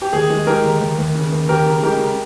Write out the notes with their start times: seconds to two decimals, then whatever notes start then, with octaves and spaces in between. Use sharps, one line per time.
0.02 G4
0.13 D#2 G#4
0.30 G#3
0.47 G#3 G4 A#4
0.65 D#2
0.81 D#2
0.98 D#2
1.15 C#3
1.32 D#2
1.49 D#2 G4 A#4
1.66 C#3
1.83 G#3 G4 A#4
2.00 C#3